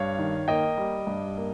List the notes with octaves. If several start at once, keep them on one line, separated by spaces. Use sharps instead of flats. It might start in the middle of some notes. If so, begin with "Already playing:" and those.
Already playing: G2 C#5 F5
D#3
A#3 D#5 G5
G3
G2
A#3